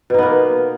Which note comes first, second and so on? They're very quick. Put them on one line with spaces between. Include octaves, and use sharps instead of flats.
B2 D#4 B3 A#3